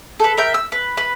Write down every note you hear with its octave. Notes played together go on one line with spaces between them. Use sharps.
A4 B4
A#4 E5 G5
E6
B4
B4